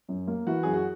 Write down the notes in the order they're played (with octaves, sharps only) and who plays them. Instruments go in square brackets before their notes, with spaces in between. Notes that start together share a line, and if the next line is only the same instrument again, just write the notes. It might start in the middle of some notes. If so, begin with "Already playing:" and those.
[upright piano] F#2
A#3
[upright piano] E3 [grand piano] F#4
[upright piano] F#2 [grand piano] G#4
[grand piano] F#4